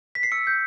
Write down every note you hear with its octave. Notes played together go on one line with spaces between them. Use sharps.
B6
C7
E6 C#7
G6